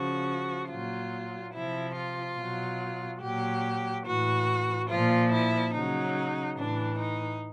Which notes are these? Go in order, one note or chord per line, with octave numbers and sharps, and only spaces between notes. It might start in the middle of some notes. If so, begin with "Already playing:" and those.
Already playing: C#3 F3 F#4
A#2 F#3 F4
C3 F3 E4
F4
B2 F#3
A#2 F#3 G4
A2 E3 F#4
A#2 F3 F4
E4
C#3 F#3 D#4
A2 E3 D4
D#4